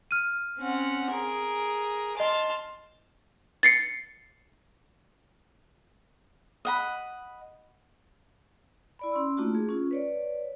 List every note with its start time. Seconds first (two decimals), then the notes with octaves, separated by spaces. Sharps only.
0.11 F6 D#7
0.60 C4 C#4 F#5
1.10 G#4 A#4
2.20 D#5 A5 C6 F6
3.63 A6 C7 C#7
6.65 D#5 F#5 B5
8.99 E4 D5 B5
9.12 C#4 C6 E6
9.37 A3 A#3 D4 D#4 F4 F#4
9.55 G#4
9.69 C#4 F4
9.91 B4 C#5 D5